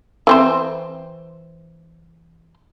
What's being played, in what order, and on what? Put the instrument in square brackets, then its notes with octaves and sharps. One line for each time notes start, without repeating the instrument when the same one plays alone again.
[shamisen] E3 C4 C5